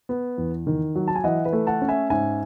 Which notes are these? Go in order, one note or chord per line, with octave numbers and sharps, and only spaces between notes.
B3
E2
D#3
F#3
A5
G#5
E3 D#5 F#5
B4
A3
F#5 A5
C#4
E5 G#5
G#2 E5 G#5